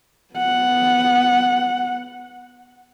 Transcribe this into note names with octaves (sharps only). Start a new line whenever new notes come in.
B3 F#5